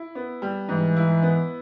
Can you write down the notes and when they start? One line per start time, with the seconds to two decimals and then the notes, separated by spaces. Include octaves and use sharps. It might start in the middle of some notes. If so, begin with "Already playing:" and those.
Already playing: E4
0.15 B3
0.42 G3
0.68 G#2 E3
0.96 E4
1.23 B3